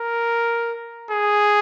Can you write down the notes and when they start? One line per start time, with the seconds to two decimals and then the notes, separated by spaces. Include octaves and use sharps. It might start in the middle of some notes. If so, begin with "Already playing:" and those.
Already playing: A#4
1.11 G#4